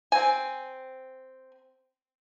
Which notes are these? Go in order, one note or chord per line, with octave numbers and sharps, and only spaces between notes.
C4 G#5